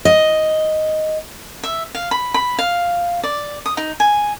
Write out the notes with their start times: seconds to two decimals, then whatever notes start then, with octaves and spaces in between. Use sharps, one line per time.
0.05 D#5
1.64 E5
1.95 F5
2.11 B5
2.34 B5
2.59 F5
3.24 D5
3.66 D#6
3.77 D#4
4.00 G#5